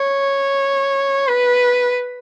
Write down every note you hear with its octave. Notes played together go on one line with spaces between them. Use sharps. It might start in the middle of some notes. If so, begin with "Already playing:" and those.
Already playing: C#5
B4